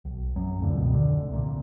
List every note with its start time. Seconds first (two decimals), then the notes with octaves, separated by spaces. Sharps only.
0.05 B1
0.36 F#2 F#3
0.60 D1 F2 A2 D3
0.76 C#2 B2 D#3
0.94 F1 D3
1.29 C2 A#2